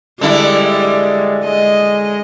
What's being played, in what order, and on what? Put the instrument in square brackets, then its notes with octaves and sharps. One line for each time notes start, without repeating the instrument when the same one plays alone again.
[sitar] D3 D4 E4 [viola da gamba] G3 [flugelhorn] G#3
[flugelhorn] G#3 [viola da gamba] D#5